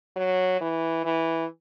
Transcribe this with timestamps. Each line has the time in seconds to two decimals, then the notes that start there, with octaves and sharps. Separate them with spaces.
0.16 F#3
0.61 E3
1.05 E3